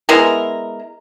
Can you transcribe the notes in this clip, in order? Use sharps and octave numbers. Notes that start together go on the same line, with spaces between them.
G#3 B3 E4 A#4